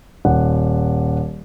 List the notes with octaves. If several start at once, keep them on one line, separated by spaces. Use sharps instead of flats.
D#1 F#5